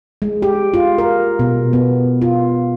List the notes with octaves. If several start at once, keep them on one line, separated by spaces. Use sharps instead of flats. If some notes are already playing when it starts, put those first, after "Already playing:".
G#3
G4
F4
A#4
B2
B3
F4